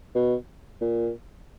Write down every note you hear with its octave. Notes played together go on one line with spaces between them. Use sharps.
B2
A#2